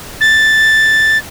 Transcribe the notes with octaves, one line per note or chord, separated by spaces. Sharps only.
A6